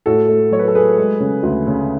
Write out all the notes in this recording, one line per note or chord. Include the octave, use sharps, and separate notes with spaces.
A2 F#4 A4
A3
F#3 C#5
B4
A4
A3 G#4 B4
G#3
C#3
D2
C#3